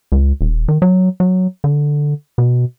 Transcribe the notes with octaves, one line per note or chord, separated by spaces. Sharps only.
C#2
D#1
D#3
F#3
F#3
D3
B2